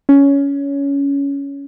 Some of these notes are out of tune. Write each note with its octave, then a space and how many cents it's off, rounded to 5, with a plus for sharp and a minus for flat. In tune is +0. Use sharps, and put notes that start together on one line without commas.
C#4 +15